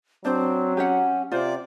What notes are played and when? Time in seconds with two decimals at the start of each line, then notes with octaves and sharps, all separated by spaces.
0.25 F#3 C4 D4 C5
0.77 C#4 G4 C#5 F#5
1.32 C3 F4 C5 D5